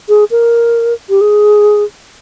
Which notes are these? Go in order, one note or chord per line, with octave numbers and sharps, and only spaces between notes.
G#4
A#4
G4
G#4